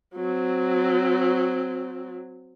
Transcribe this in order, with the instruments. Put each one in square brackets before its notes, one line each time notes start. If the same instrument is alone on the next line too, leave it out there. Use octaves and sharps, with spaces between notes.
[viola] F#3 C4